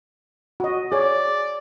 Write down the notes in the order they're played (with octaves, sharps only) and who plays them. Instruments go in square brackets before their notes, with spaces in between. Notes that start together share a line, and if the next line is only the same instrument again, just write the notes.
[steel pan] F#4 D#5
[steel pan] G#4 C#5 [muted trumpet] D5